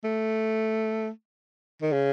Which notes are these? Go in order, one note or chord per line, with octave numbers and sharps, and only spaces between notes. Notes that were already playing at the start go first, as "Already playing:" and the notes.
A3
D#3
C#3